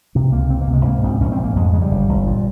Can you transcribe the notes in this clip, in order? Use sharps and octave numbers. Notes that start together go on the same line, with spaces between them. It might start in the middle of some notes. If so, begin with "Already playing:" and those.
C3 C4
C#2 A#3
C#2 C4
A#3
C3
G#3
G#2 A#3
A#1 C4
A#1 C#4
C4
G#2
A#3
F2 G#3
C#3 G#3
G3
G1
G1
A#2